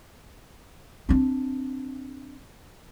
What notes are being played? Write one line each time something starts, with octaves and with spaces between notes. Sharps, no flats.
C4 D4